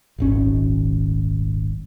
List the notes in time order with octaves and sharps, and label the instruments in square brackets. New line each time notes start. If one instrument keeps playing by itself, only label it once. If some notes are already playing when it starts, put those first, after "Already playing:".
[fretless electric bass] D#1 G#1 C#4